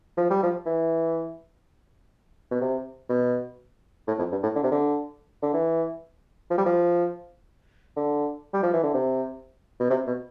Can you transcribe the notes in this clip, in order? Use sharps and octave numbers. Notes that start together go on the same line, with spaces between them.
F3
G3
F3
E3
B2
C3
B2
A2
F2
G2
A2
D3
C3
D3
D3
E3
F3
G3
F3
D3
G3
F3
E3
D3
C3
B2
C3
B2